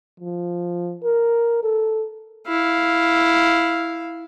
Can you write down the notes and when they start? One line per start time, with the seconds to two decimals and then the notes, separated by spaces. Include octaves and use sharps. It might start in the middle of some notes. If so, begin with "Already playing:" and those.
0.20 F3
1.03 A#4
1.63 A4
2.47 E4 F5